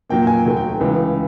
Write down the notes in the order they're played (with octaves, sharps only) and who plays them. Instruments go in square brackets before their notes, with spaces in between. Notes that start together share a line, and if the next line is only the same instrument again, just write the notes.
[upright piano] A#2 F#3 A#3 G5
G#5
D#2 D#3 F#3 A3 G5
G5
G5
C#2 C#3 E3